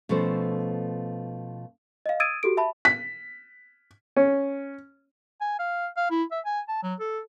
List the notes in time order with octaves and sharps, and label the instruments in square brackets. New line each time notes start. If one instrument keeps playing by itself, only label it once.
[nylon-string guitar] B2 F3 A3 C#4 A4 C5
[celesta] D#5 F5
D#6 E6 G#6 A6 D7 D#7
F#4 G4 A4 D7
E5 A5 B5
[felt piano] B6
[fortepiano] C#4
[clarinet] G#5
F5
F5
E4
E5
G#5
A5
F#3
A4